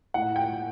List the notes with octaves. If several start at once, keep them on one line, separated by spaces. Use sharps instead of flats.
A2 F#5
G5